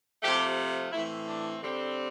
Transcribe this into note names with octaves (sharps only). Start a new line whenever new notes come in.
C3 F3 A3 G4
A2 E3 A3 C4 E4
D4
D3 G3 C4